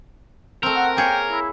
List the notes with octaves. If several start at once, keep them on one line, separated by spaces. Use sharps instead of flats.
A3 C4 A#4
F#5
A#3 G#4 C#5 G5
E4